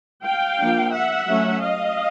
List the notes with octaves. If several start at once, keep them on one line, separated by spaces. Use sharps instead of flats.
F5 G5
F3 A#3 D4
E5 F#5
F#3 A3 C#4
D#5 F5